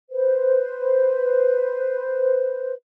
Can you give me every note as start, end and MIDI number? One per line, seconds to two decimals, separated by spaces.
0.11 2.73 71
0.11 2.73 72